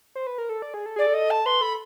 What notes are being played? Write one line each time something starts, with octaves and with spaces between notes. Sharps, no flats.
C5
B4
A#4
A4
D5
G#4
A4
G#4 D5
A4
D#5
A5
B4 C6
A4 B5